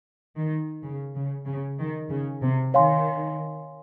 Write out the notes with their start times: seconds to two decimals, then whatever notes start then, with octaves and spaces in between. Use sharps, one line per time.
0.36 D#3
0.84 C#3
1.15 C#3
1.47 C#3
1.79 D#3
2.10 C#3
2.42 C3
2.74 D#3 C#5 F5 G#5 C6